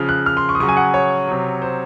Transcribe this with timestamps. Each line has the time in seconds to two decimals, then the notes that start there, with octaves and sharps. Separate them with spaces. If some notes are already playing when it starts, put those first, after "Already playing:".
Already playing: C#3 F3 F6
0.09 F#6
0.26 F6
0.37 C6
0.49 C#6
0.55 D#6
0.60 C#3 F#3 C#6
0.69 G#5
0.77 F#5
0.94 C#5
1.27 C3 F#3
1.62 C5